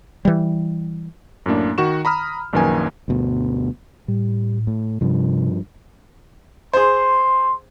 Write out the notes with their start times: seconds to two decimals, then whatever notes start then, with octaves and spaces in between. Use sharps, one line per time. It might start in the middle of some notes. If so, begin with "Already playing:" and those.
0.25 E3 G3
1.46 F#2 A2 A#3 D4
1.78 D#3 F#4 C#6 E7
2.05 A#5 B5 D#6 F6
2.53 A#1 F#2 D#3 A#3 B4 G#5
3.08 D2 G2 B2
4.08 A2 G3
4.67 A2
5.01 G2 C3 F3
6.73 G#4 C5 C6